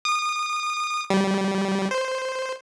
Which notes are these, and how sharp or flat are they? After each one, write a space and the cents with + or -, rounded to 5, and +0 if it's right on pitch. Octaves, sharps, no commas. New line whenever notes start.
D#6 -30
G3 -15
C5 -5